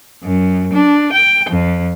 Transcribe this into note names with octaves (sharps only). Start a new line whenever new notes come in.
F#2
D4
G5
F2